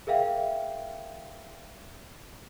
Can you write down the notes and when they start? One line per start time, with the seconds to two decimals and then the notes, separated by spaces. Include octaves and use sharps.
0.07 G#4 A#4 E5 F5 G5